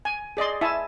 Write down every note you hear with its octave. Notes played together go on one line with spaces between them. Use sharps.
G#5
G#4 D5 D#5 C6
E4 E5 G#5 A5